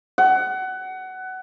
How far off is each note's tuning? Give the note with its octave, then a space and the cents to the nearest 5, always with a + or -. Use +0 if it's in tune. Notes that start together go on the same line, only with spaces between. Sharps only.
F#5 +20